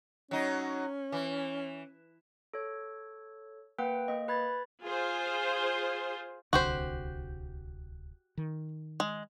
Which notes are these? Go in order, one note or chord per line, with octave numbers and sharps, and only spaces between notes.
F#3 C#4 D#4
E3
A4 C#5
A#3 B4 F#5 G5
A#3 D#5
B4 B5 G#6 A6
F4 G#4 C5
D1 C2 D3 F#4 G4 C5
D#3
G#3